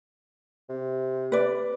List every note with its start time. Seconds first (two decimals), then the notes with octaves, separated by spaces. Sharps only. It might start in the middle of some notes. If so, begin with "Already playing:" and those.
0.70 C3
1.32 B4 D5